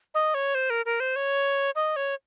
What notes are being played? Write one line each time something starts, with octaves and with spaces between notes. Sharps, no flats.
D#5
C#5
C5
A#4
A#4
C5
C#5
D#5
C#5